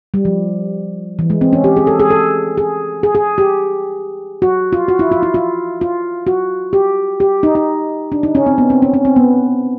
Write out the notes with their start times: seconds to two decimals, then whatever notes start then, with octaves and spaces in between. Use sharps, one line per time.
0.14 G3
0.25 F3
1.19 E3
1.30 G#3
1.41 C4
1.53 C#4
1.64 G4
1.77 G#4
1.87 A4
2.00 G#4
2.10 A4
2.58 G#4
3.03 G#4
3.15 G#4
3.38 G4
4.42 F#4
4.73 F4
4.88 F#4
4.99 E4
5.12 F4
5.23 E4
5.34 F4
5.81 F4
6.27 F#4
6.73 G4
7.20 G4
7.43 D#4
7.55 D#4
8.12 D4
8.23 D#4
8.35 C#4
8.46 C4
8.58 B3
8.70 C4
8.82 C#4
8.94 C#4
9.05 C4
9.16 B3